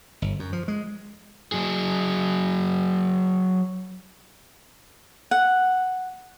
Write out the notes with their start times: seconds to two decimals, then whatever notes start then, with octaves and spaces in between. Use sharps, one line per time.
0.22 G1
0.39 F#2
0.53 F3
0.68 G#3
1.52 F#3 G#4
5.31 F#5